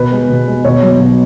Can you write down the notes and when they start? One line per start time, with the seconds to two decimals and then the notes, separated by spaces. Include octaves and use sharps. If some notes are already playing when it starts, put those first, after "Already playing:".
Already playing: B2 B4
0.12 G#3
0.29 B2
0.48 G#3
0.65 B2 C#5
0.82 F#3
1.00 B2